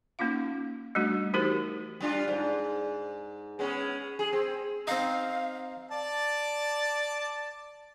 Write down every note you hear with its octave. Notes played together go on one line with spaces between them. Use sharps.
A#3 C#4 D#4 F4 F5
G3 A3 D4 F#4
E3 D#4 F#4 G4 A#4 C5
G3 D4 F4
G#2
G#3 B3 C#4
G#4
C4
C4 D#4 F5
D5 A5